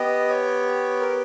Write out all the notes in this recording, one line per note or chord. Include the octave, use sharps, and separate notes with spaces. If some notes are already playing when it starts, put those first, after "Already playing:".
Already playing: B3 G4 D#5
C#5
A#4